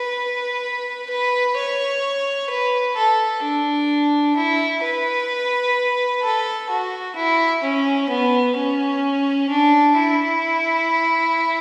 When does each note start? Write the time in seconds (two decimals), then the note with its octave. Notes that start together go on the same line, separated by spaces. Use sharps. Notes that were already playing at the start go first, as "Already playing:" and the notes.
Already playing: B4
1.10 B4
1.57 C#5
2.50 B4
2.96 A4
3.43 D4
4.36 E4
4.83 B4
6.23 A4
6.70 F#4
7.16 E4
7.63 C#4
8.09 B3
8.56 C#4
9.49 D4
9.96 E4